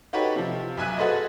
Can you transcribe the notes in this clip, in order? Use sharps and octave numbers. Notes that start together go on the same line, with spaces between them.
D#4 F#4 G4 A4 B4 C#5
C3 F3
B1 E5 G#5 F#6 D#7
F#4 G#4 A4 B4 C5 D#5